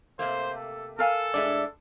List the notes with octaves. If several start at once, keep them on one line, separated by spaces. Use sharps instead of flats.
C3 A3 A#3 C5
A4
A4 A#4 F5 G#5
A2 G#3 D4 D5 E5